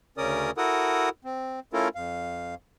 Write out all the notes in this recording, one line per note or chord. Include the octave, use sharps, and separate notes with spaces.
D2 C#3 C#4 A#4 D5 D#6
E4 F#4 A4 A#4 F#5 D#6
C4
A3 C#4 E4 F4 A4 A#4
F2 F5